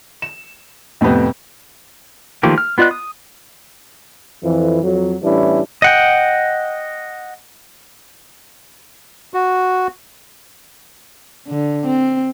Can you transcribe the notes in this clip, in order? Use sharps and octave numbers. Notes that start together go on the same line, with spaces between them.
E7
F2 A2 C3 B3 C4
D#3 F3 A3 A#3 G4
F6
B3 F4 D5 D#5 F#6
D#6
F2 E3
F2 F#3
A2 E3 G3 C#4 D4 E4
D#5 F#5 G5
F#4
D3
C4